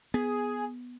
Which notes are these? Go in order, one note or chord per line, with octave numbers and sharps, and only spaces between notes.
B3 G#4